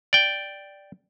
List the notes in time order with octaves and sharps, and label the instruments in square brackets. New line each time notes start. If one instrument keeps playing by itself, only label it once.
[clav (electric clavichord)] D5 G5